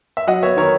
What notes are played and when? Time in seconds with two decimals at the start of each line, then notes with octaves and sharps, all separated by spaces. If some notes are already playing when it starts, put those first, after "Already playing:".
0.17 E5
0.27 F#3 D#5 F#5
0.43 B3 C#5 E5
0.57 D#3 A#4 C#5